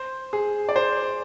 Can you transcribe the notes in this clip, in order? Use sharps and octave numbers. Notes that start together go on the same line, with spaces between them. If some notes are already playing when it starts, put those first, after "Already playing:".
Already playing: C5
G#4
D5
C5